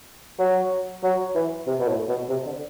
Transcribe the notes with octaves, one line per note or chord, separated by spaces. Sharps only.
F#3
F#3
E3
C3
B2
A2
B2
C3
D3